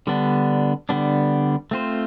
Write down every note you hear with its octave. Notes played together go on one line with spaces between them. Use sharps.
D3 G3 B3 D4
D3 G3 B3 D4
A3 C4 F4 C5